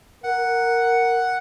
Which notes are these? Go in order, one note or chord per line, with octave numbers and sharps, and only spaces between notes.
A#4 F#5